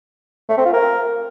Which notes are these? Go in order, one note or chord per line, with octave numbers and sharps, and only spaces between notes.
A3
C4
F4
A#4